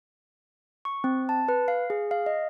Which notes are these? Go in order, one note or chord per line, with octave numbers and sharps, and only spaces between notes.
C#6
C4
A5
B4
F5
G#4
F5
D#5